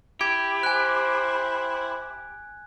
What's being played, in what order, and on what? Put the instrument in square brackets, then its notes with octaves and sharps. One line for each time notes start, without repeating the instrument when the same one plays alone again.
[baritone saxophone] E4 [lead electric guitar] G4 [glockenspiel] G#6
[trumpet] C5 [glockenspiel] G#5 F#6